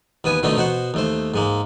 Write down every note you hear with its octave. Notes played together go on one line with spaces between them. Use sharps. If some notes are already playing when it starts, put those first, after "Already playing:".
D#2 B3 B4 G#5
B2 D3 D#3 A3 C4 D#4
B2 F#4 C5 F#5
D#2 A3 C5
G#2 G#3 A#3